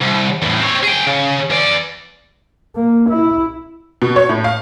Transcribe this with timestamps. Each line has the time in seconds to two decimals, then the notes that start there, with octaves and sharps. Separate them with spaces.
0.01 C2
0.42 E2 A2
0.60 C4 C#5
0.83 G#4 G5
1.06 C#3
1.50 E3 D5
2.76 A#3
3.10 E4
4.02 B2
4.16 C#5
4.29 A2
4.44 F5